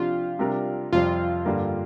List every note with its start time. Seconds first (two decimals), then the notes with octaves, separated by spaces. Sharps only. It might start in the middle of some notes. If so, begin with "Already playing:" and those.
Already playing: C3 F3 D4 F4 G4
0.39 C3 G3 D4 A#4
0.92 F2 C3 G3 C4 F4
1.45 G2 D3 G3 A#3